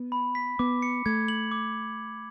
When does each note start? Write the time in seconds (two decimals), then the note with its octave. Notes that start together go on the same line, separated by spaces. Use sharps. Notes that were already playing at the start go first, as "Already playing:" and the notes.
Already playing: B3
0.12 B5
0.35 B6
0.59 B3 D6
0.82 C#7
1.06 A3 G#6
1.28 F#7
1.51 D6